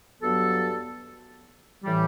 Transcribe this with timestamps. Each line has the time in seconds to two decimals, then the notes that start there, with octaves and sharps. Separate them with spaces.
0.21 G2 F#3 B3 F#4 A4
1.84 A2 E3 G3